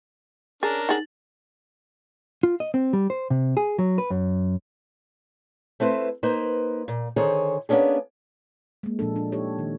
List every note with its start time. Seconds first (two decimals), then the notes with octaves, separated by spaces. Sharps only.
0.63 C#4 D4 G#4 A#4 A6
0.89 D#4 G#4 F#5 A6 F#7
2.43 F4
2.60 D#5
2.74 C4
2.93 G3
3.10 C5
3.30 C3
3.57 G#4
3.78 F#3
3.98 B4
4.10 F#2
5.80 A3 C4 E4 B4 C5
6.23 A#3 D#4 B4 C5
6.88 A#2
7.16 D3 D#3 G#4 C5 C#5
7.69 A#3 B3 C#4 D4 G#4
8.83 G#3 A#3
8.99 A#2 F3 D4 A4
9.16 D4
9.32 D#4 G4 A4 C#5
9.59 D#3